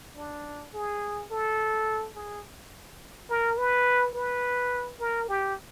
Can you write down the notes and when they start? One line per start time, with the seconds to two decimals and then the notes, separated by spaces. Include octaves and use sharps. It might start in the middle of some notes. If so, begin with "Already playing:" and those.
0.16 D4
0.74 G#4
1.31 A4
2.15 G#4
3.30 A#4
3.58 B4
4.15 B4
5.00 A#4
5.28 G4